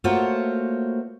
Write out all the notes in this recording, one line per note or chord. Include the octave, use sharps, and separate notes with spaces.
A3 A#3 F4 F#4 C5 C#5